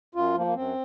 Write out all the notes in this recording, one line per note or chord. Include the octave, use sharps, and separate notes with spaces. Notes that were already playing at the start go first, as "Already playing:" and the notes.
F#2 F4
F3 A#3
A#3
F#2 C4